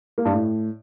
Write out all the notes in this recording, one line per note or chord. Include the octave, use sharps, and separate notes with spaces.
A#3
G2
A2